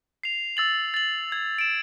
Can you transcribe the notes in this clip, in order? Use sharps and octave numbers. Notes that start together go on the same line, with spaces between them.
C7 F7
E6 A6 F#7
A6 F#7
G#6
D7 E7